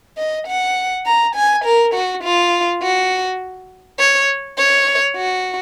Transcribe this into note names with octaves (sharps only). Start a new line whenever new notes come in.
D#5
F#5
A#5
G#5
A#4
F#4
F4
F#4
C#5
C#5
F#4